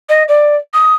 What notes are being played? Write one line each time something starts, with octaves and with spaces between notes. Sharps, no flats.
D#5
D5
D#6